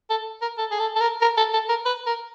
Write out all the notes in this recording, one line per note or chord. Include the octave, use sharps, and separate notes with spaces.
A4
A#4
A4
G#4
A4
A4
A#4
A#4
A4
A4
A#4
B4
A#4